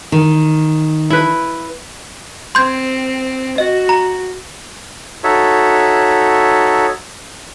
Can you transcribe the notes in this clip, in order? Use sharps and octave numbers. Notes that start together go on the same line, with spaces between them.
D#3
E4 B4
C4 C6 G6 G#6
F#4 D#5
A#5
D#4 F#4 A4 C#5 E5